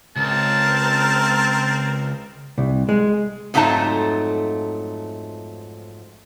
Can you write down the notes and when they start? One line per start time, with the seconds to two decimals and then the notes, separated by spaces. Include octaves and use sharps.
0.16 C#2 C4 A#4 A5
2.58 C2
2.89 G#3
3.54 F2 G#2 F#3 A3 D#4 A5